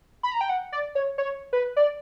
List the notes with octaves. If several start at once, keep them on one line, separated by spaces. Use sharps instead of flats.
B5
A#5
G5
F#5
D5
C#5
C#5
B4
D5